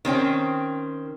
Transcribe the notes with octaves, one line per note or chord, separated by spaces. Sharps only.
D#3 C4 C#4 G5